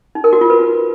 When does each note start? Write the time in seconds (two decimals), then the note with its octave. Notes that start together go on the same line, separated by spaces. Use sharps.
0.15 D#4
0.24 A#4
0.33 F#4
0.41 F4
0.50 B4